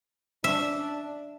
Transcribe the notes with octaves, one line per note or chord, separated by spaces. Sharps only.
D4 E5